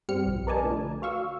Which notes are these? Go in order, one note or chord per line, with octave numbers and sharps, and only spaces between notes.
G2 G3 C4 G4 F6 C#7
B1 F3
A#4 B4 D5 D#5 G#5 A5
D3 F3 A3
F#4 F5 C#6 E6